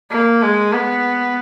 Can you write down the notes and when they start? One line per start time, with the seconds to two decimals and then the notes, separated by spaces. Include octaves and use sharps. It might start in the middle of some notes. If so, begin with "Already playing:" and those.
0.11 A#3
0.42 G#3
0.72 B3